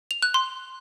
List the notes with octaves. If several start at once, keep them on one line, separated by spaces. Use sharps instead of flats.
F7
F#6
C6